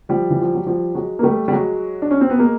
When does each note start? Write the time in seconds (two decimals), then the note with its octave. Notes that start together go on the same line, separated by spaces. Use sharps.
0.09 F3 G3
0.30 E3
0.42 F3
0.55 F#3
0.66 F3 G3
0.95 F#3 G#3
1.19 A#3
1.23 G3 A3
1.48 G3
1.52 F#3 G#3
2.02 D4
2.11 C#4
2.21 C4
2.30 B3
2.39 G#3 A#3